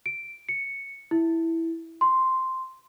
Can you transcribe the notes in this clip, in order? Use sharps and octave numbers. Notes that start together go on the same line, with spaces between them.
D7
C#7
E4
C6